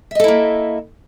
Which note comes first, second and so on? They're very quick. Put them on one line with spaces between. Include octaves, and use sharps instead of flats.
E5 D#5 A4 E4 A#3